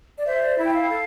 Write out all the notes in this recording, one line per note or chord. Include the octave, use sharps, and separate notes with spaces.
D5
C5 E5
D5
E4 E5
G5
F5
A4